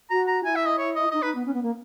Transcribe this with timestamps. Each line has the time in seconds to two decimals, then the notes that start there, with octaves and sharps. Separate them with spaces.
0.10 F#4 A#5
0.28 A#5
0.44 E4 G#5
0.56 E5
0.66 D#5
0.78 C#5
0.95 D#5
1.11 D#4 D#5
1.22 D#4 B4
1.34 B3
1.46 C#4
1.53 B3
1.63 A#3